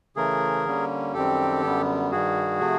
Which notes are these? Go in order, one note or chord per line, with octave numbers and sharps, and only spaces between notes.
C#3 E3 A3 G#4 A#4
D3 G3 A#3 C#4
F#2 D#3 G3 C4 G4 A4
F#2 D3 G3 B3
G2 D#3 G3 F#4 G#4
C3 F3 A3